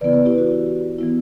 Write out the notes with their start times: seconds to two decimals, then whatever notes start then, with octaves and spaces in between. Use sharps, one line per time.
0.01 C#3 E3 B3 E4 B4 D5
0.13 B4 D5
0.25 E4 G4
0.38 F#4
0.99 E3 B3 E4